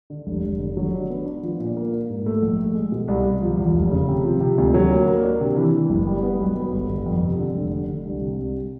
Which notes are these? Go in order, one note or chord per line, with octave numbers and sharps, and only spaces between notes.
D3
F1
F1
D3
F#3
D4
B3
D4
F3
A#2
A#3
A#3
G#2
A3
A#1
A3
G#3
B2
C2
C2
F3
E2
F1
C#3
C3
F3
C3
D2
F#3
A#3
A#3
D4
C3
E3
E3
F#1
G3
B3
B1
B3
G1
G1
F2
C3
D3
F1
D3
D3
C2
C3
C2